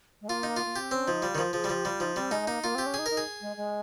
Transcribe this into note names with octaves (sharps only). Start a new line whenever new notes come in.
G#3
A#3 F4
D#4
F4
A#3
C4 G4
C4 C#4
F3 D#4
G3 F4
D#3
F3 F4
F3 G#4
G3
F3 G4
G3 F4
F3 D#4
G3 C4
G#3 D#4
A#3 D#4
A#3 F4
C4 G4
C#4
D#4 G#4
D#4 A#4
G#4
G#3
G#3